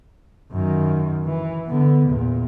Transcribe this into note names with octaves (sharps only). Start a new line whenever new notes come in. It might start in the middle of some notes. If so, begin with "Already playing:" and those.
F#2 D#3
E3
D3 B3
E2 A#2